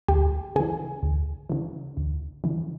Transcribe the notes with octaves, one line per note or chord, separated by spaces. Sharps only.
D2 G4
C#3 E3 G#4
D2
C#3 E3
D2
C#3 E3